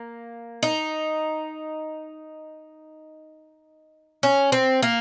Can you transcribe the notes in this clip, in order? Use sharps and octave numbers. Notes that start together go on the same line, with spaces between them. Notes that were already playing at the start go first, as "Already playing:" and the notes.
Already playing: A#3
D#4
C#4
C4
A#3